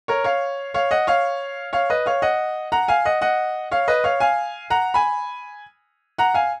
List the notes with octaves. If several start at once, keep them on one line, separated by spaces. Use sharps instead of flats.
A#4 C#5
C#5 F5
C#5 F5
D#5 F#5
C#5 F5
C#5 F5
B4 D#5
C#5 F5
D#5 F#5
F#5 A#5
F5 G#5
D#5 F#5
D#5 F#5
C#5 F5
B4 D#5
C#5 F5
F5 G#5
F#5 A#5
G#5 B5
F#5 A#5
F5 G#5